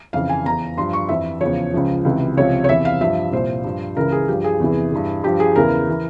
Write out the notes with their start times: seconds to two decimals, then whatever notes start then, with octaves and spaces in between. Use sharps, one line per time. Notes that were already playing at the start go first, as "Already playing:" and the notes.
0.13 F2 C#3 E3 F5
0.29 G#5
0.45 E2 E3 A#5
0.77 G2 F3 C6
0.93 C#6
1.09 F2 E3 E5
1.41 E2 C#3 F3 C#5
1.74 C#2 C#3 F3
2.05 C#2 C3 E3
2.37 C#2 C3 F3 C#5
2.64 C#5
2.69 E2 C3 E3 E5
2.85 F5
3.01 G2 F3 E5
3.32 C2 A#2 F3 C5
3.64 G2 F3
3.96 C#2 C#3 E3 A#4
4.12 G#4
4.28 G2 F3 G4
4.44 G#4
4.60 E2 C3 E3
4.92 G2 E3
5.24 G2 F3 G4
5.40 G#4
5.56 E2 C#3 E3 A#4
5.90 E3